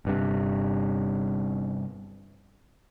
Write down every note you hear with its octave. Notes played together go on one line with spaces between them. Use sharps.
G1 G2 C3